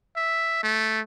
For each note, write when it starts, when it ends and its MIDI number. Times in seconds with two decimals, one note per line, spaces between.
0.16 0.58 76
0.63 1.01 57